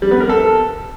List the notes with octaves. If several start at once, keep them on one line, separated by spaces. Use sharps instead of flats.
G3
B3
A#4
A4